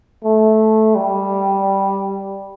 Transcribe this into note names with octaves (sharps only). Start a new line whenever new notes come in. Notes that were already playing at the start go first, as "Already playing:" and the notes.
A3
G3